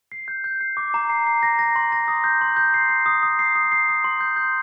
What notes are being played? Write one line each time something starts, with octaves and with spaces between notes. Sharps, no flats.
C7
G6
G6
C7
D6
A#5
C7
C7
A#6
A#6
C6
A#6
D#6
G6
C6
G6
C7
C7
D#6
D#6
C7
D#6
C7
D#6
C6
G6
G6